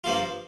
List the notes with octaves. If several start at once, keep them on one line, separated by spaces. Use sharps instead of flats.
G2 F3 A#3 F4